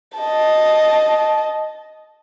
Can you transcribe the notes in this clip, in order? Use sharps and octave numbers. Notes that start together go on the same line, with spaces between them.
D#5 A5